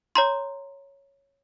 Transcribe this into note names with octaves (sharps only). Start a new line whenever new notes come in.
C#5 A#5 C6